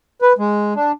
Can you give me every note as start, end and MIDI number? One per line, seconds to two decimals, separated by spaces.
0.22 0.33 71
0.38 0.73 56
0.76 0.92 62